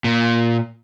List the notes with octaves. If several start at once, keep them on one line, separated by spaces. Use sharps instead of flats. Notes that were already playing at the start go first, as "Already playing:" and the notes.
A#2